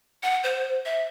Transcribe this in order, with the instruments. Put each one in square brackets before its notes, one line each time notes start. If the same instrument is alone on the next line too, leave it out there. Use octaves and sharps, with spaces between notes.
[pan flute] F#5
C5
E5